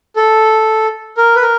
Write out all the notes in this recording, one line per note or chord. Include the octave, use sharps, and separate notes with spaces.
A4
A#4
B4
A#4